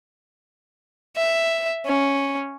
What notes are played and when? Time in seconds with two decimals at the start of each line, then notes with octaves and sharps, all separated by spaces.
1.17 E5
1.86 C#4